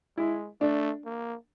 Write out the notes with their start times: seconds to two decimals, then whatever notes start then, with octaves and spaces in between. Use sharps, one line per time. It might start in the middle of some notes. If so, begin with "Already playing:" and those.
0.17 G#3 E4
0.61 A3 D4
1.05 A#3